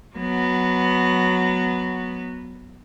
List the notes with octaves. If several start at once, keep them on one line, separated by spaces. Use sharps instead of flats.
F#3 B3